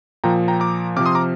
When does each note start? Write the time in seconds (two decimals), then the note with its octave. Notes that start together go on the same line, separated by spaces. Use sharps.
0.24 A#2 F3 G5 A#5
0.48 G5 A#5
0.60 A#5 D6
0.97 C3 D6 F6
1.00 F3
1.06 C6 D#6
1.15 A#5 D6